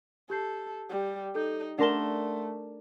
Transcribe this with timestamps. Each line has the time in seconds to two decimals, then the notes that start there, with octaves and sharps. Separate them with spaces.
0.30 G4 A4 G6 C7
0.90 G3
1.35 D#4 A4 G6
1.78 A3 D4 A#4 F#5 A5 C6 G7